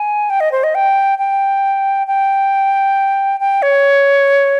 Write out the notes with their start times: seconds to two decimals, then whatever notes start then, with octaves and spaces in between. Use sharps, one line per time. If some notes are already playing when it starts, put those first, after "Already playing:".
Already playing: G#5
0.30 G5
0.40 D#5
0.52 C5
0.64 D#5
0.75 G5
1.19 G5
2.07 G5
3.40 G5
3.62 C#5